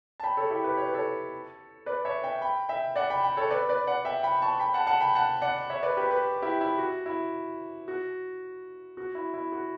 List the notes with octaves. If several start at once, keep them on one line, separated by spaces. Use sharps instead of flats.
A5
G5 B5
A4 C#5
E4 G4
G4 B4
C#5
B4
A4 C#5
B4 D5
C#5 E5
E5 G5
G5 B5
E5 G5
D5 F#5
G5 B5
G5 B5
A4 C#5
B4 D5
B4 D5
D5 F#5
E5 G5
G5 B5
A5 C#6
G5 B5
F#5 A5
F#5 A5
G5 B5
F#5 A5
D5 F#5
C#5 E5
B4 D5
G4 B4
G4 B4
E4 G4
E4
F#4
E4
F#4
F#4
E4
E4
F#4